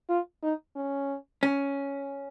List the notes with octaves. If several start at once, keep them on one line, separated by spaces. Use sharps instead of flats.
F4
D#4
C#4
C#4